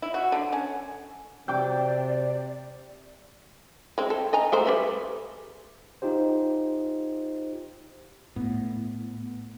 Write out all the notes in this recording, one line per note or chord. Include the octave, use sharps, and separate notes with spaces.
E4
F#4
D3
C#4
C3 D5 G5 D6
G#3 C4
A4
D#5 G#5 A#5
G#3 A3 C5
G3 B4 E5
D#4 F4 G4 C5
A2 B3